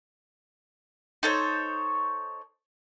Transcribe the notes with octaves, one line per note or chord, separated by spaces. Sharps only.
D#4 A4 C5 C#5